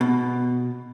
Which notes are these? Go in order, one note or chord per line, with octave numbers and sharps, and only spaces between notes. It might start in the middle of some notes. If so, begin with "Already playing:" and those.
B2